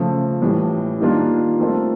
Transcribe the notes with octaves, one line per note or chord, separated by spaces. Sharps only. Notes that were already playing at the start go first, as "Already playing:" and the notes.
Already playing: C#3 F3 A3
A2 E3 G3
D#3 G3 A#3 D4 F4
A3 C4 F4 A#4